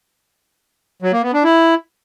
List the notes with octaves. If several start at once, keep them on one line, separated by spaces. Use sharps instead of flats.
F#3
A#3
B3
D4
E4